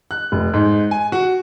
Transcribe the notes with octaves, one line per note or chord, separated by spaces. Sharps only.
F#6
F1
G#2
G#5
F#4